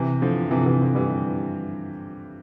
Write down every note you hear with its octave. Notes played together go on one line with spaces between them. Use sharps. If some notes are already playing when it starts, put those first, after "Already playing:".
Already playing: C3 E3
D3 F3
C3 E3
C3 E3
D3 F3
E3 G3